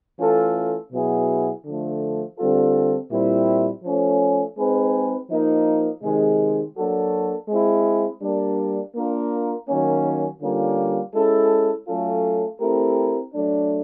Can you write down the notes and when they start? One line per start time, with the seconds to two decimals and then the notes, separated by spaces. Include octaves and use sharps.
0.19 E3 A3 C#4 F4 A4
0.92 B2 F#3 B3 E4 G#4
1.65 D3 F3 A3
2.38 D3 G3 C4 F4 A4
3.11 A#2 G3 C4 E4
3.84 F3 A3 C#4
4.56 G#3 C4 D#4 G#4 B4
5.29 F3 A#3 D#4
6.03 C3 D#3 G#3
6.76 F#3 A#3 D4 F#4 A4
7.48 G#3 C4 E4
8.22 G3 A#3 D4
8.95 A#3 D4 F4 A#4
9.68 D#3 F#3 A#3 C#4
10.41 D3 G3 A#3 C#4 F4
11.14 G#3 C#4 E4 A4
11.87 F#3 A3 C#4 F4 A4
12.60 A3 C4 E4 G4 A#4
13.33 F#3 A3 D4